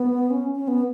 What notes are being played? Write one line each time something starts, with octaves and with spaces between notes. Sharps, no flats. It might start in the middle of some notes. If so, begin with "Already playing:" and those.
Already playing: B3
C#4
C#4
B3